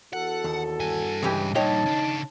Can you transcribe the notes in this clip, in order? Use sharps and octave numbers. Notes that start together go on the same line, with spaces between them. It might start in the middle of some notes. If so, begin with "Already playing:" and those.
E2 F#4 A4 F#5
D#2
G2 G#5
C#2 E3 G4
G2 A#2 D#4 C#5 D#5 G5 A5
C#3 D4